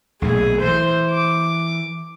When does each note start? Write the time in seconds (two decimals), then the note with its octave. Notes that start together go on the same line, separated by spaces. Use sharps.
0.22 B1 A#2 A3 G#4
0.61 E3 C5
1.11 D6